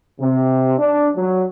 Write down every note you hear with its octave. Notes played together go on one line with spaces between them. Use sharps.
C3
D4
F#3